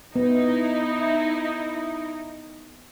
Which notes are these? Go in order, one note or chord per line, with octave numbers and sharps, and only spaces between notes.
B3 D#4 E4